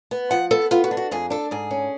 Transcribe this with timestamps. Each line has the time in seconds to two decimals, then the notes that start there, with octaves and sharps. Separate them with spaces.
0.11 B3
0.31 F3 F#5
0.51 B3 A4
0.71 B3 F4
0.84 F#4
0.91 D4
0.97 F#4
1.11 F2 G#4
1.30 D4 A4
1.51 G#2 G#4
1.71 C#4